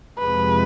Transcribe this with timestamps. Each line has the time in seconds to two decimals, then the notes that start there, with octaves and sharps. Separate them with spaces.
0.18 F2 C3 F3 G#3 B4